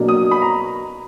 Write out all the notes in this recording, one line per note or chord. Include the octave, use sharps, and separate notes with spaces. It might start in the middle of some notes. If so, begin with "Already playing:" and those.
Already playing: B2 F#3 A#3 D4
D#6
B5
A#5